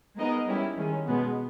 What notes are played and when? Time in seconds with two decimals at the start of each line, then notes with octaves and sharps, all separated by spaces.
0.17 G#3 B3 D#4 A#4 D#5
0.47 G3 C#4 E4 G4
0.76 D#3 G#3 C#4
1.07 B2 G#3 B3